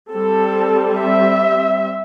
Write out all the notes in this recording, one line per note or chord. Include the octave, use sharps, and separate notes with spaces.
G3 C4 A4
E5